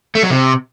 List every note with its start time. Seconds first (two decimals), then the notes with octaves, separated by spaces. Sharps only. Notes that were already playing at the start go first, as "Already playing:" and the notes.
0.15 A3
0.23 F#3
0.31 C3